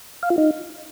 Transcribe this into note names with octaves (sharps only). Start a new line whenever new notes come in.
F5
F4
D#4